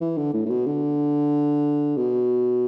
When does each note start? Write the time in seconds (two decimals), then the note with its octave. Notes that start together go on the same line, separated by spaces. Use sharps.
0.01 E3
0.17 D3
0.33 A2
0.46 A2
0.50 B2
0.66 D3
1.97 B2